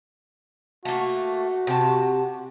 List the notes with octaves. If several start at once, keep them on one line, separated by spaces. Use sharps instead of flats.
A3 A#3 F#4
C3 A5